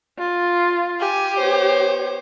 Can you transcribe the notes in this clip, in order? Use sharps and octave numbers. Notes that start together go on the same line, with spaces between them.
F4
G4 G#5
B3 C5 C#5